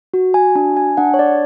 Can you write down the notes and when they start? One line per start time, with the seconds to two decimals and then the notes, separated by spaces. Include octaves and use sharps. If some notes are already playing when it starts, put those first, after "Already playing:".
0.14 F#4
0.34 G#5
0.55 D4 G#5
0.77 G#5
0.97 D4 F#5
1.14 C#5
1.19 D5